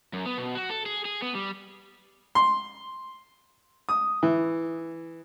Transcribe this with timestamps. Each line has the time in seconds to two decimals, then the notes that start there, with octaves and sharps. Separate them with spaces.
0.13 F#2
0.26 B3
0.38 B2
0.55 F#4
0.70 A4
0.86 G#4
1.05 G#4
1.22 B3
1.35 G3
2.35 C6
3.89 D#6
4.23 E3